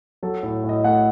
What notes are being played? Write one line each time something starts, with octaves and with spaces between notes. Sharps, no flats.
F#3 A4
A2
A2
D#5
A3 F#5